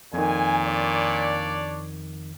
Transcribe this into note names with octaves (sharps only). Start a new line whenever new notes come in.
F2 A#2 D#3 G#5
D4 C#5 D5